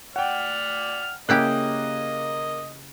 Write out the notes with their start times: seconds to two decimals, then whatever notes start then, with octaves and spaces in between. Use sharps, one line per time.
0.16 D5 F#5 G5 F6
1.29 C#3 A#3 E4 G4 D#5 F#6